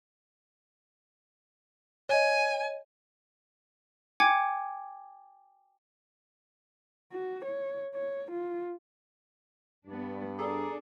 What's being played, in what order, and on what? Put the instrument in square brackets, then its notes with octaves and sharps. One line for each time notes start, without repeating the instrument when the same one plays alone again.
[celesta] C#5 D#5 [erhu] G#5
[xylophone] G5 G#5 D6 G#6 C#7
[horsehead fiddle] F#4
C#5
C#5
F4
[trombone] G2 [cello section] B3 D4
[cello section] D4 [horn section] G#4 A4 D5 [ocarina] A#5